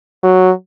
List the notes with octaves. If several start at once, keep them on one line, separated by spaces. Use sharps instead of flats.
F#3